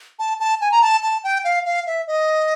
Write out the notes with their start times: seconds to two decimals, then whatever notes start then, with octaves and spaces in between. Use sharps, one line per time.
0.19 A5
0.40 A5
0.61 G#5
0.71 A#5
0.82 A5
1.03 A5
1.24 G5
1.44 F5
1.65 F5
1.87 E5
2.07 D#5